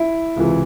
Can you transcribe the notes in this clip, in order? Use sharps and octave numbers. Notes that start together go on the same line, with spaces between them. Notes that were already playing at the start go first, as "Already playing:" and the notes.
Already playing: E4
C#2 C3 E3